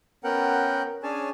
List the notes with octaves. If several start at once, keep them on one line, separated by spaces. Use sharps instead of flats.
B3 C#4 A#4 F#5 G5
C#4 D4 G#4 C#5 G#5 A5